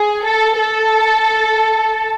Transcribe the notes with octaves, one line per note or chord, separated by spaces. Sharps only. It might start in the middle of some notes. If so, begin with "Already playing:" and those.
Already playing: G#4
A4
A4